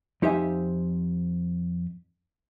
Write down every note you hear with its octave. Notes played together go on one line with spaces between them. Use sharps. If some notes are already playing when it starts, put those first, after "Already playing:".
F2 D#4 G4 C5 E5 G#5